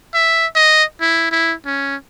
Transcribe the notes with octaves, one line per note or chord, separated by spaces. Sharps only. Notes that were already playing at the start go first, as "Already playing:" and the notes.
E5
D#5
E4
E4
C#4